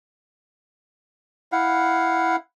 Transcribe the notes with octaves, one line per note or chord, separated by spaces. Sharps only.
E4 F5 F#5